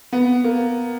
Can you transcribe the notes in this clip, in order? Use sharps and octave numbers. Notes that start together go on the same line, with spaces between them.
B3
A#3